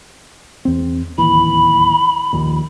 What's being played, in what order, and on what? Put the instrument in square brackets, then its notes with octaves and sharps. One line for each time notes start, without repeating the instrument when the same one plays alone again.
[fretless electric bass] E2 C4
[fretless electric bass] D1 D#2 E3 [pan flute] B5
[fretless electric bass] A#1 D#2 A#2